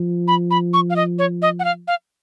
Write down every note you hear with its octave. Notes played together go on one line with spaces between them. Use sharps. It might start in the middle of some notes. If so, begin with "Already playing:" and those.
Already playing: F3
B5
B5
C#6
F5
D#5
C#5
D#5
F#5
F5
F5